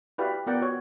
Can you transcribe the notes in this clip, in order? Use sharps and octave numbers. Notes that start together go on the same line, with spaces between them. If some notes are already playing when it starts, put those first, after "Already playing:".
E4 F#4 G4 B4 D5 F5
B3 F4 A#4 D5 F#5 G5
F#4 C#5